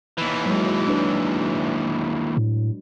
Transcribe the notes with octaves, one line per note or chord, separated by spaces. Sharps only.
D#2 E3
F#3 G#3
D4 B4
A2